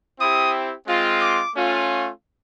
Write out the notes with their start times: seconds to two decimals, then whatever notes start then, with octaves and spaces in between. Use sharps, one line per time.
0.19 C4 E4 G4 D#6
0.87 G#3 C4 F4
1.21 D6
1.56 A3 C#4 F4